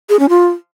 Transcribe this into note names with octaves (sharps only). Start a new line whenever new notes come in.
G#4
C#4
F4